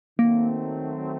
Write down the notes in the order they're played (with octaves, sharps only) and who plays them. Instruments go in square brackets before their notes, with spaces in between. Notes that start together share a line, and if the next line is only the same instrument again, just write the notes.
[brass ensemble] D#3 F#3 A3 C4 [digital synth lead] A#3